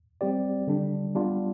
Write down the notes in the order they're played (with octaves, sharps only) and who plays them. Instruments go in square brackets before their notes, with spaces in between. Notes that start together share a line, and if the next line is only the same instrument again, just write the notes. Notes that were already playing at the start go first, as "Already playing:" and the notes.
[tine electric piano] G3 C4 G4 D5
D3 G3 D4
G3 B3 D4 F4